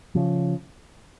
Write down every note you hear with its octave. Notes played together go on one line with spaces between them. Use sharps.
C#3 F3